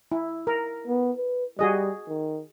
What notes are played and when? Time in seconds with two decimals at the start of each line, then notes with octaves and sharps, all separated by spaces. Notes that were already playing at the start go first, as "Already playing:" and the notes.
0.12 E4
0.47 A#4
0.87 B3
1.16 B4
1.59 G3 F#4 G#4 D#5
2.08 D#3